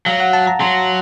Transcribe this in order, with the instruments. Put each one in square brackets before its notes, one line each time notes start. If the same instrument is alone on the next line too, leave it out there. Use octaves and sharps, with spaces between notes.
[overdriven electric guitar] F#3 [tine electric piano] F5
[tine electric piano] F#5
A5
A#5
[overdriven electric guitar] F#3 [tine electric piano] C6